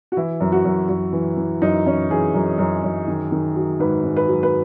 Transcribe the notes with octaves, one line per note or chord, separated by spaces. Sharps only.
F#4
E3 E4
F#2
F#4
F#2
F#2 F#4
E3
E3
F#2 D#4
E3 C#4
E3 G#4
F#2
F#2
F#2
D#3
D#3
F#3
G#2 B4
G#2
B4
F#3
B4